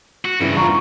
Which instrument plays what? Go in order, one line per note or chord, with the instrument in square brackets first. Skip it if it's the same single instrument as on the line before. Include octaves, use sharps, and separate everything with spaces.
[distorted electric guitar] F#4
[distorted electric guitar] G2 [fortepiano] C#3 E3
[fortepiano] E2 F4 [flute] A#5 [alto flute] C#6